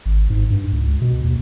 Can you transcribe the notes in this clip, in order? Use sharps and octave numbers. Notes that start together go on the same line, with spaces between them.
G#1
G#2
G2
C#2
B2
D#2